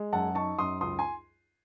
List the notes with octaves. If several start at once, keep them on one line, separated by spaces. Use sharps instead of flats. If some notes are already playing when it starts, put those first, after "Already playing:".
Already playing: G#3
F#2 F#5 A5
D#4 A5 C#6
F#2 C6 D#6
C#2 C6 D#6
G#5 C6